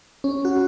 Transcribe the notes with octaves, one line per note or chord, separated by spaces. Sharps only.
C#4
F#4